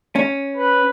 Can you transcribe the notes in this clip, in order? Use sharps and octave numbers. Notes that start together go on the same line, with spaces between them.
C#4
B4